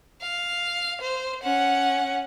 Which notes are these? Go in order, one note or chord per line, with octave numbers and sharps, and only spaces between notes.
F5
C5
C#4 F#5